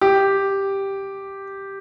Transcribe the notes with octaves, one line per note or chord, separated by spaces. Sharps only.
G4